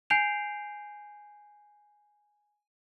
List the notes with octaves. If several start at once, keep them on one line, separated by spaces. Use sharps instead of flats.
G#5 G6 C7 D7 F7